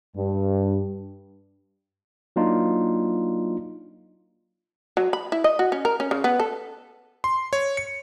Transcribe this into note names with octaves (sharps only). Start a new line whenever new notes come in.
G2
F#3 A#3 D4 D#4 F4
F#3
B5
E4
D#5
F#4
C#4
A#4
C#4
C#3
B3
A4
C6
C#5
C#7